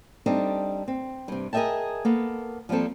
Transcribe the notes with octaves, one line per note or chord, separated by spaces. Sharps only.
G3 C4 D4 D#4 A4
C4
G2 C3
G#4 A#4 D#5 E5 G5 A5
A#3 B3 A4
F3 G3 A#3 C4 A4